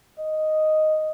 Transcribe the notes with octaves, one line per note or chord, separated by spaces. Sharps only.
D#5